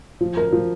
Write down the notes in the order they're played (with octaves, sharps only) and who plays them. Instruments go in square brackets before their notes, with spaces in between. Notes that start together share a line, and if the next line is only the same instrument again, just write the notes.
[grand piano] F3
A#4
F3